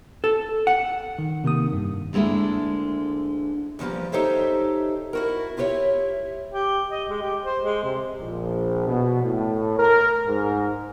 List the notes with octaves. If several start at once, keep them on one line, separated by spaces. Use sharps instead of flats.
A4
F#5
D#3
C3 D#3 A#3 D#6
G2
D2 D3 G#3 A#3 E4
E2 D3 F3 G3 A#3
D#4 G4 A4 C5 C#5 E5
E4 F#4 A#4
E4 F4 G4 B4 C#5 E5
G4
D#5
G#3
G4
C5
G#3
C3
A#1
B2
A2
A#4
G#2